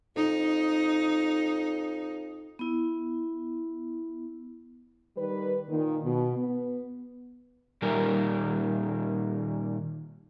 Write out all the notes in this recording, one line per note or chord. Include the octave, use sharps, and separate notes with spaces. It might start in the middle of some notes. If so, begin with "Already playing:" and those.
F2 D#4
B3 E4
D#3 G3 B4
A#2 D#3
B2
B3
A#2 D#3 G3 A#4